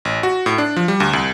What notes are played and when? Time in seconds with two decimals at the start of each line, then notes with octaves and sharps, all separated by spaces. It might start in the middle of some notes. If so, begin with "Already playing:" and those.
0.05 A1
0.23 F#4
0.46 A2
0.58 D4
0.76 F3
0.88 G3
1.00 D2
1.13 C2